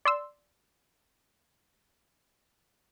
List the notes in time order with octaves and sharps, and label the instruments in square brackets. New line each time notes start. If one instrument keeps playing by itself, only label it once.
[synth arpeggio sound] D5 C6 E6